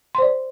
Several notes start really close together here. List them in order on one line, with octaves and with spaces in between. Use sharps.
C6 C5 D5